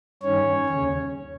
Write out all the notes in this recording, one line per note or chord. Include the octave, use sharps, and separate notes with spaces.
G2 D#3 C#4 C#5
D#2 C#3